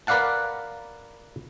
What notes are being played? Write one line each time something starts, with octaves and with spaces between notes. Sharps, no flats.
A#4 B4 D5 F5 F#5 A5